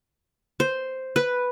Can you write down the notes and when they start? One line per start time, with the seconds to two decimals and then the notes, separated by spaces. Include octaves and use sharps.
0.60 C5
1.16 B4